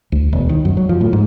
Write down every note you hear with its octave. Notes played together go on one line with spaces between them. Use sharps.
D2
E1
D#3
F#2
F#3
F3
A2
G#2